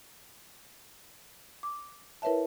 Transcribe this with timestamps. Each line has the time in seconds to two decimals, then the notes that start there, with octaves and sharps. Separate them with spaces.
1.63 D6
2.22 E4 A#4 B4 C#5 E5 A5